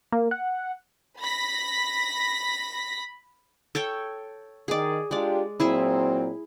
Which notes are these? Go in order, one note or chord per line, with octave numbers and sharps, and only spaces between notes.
A#3
F#5
B5 A#6 B6
A4 C#5 G5
D#3 G#4 D5
G#3 D4 F4 G4 D5
A#2 F#3 C4 E4 G#4 E5